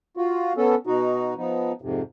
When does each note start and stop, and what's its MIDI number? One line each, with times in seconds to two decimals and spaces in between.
0.17 0.53 65
0.17 0.53 66
0.57 0.75 59
0.57 0.75 61
0.57 0.75 69
0.87 1.34 47
0.87 1.34 63
0.87 1.34 66
1.37 1.72 53
1.37 1.72 59
1.37 1.72 63
1.82 2.02 41
1.82 2.02 44
1.82 2.02 48